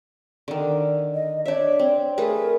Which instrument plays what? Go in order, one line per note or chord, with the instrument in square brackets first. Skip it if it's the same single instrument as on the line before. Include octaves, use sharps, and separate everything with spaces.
[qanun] D3 D#3
[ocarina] D#5
[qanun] D4 E5 [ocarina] C#5
[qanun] C4
[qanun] A3 G#4 B4 [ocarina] A#4